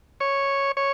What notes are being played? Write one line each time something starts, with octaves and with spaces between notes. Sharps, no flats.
C#5
C#5